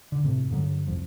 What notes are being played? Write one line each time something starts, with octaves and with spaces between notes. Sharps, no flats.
D3
G1 C2 A2 C3
G2 D3 F3 F#3
C2 F2 F3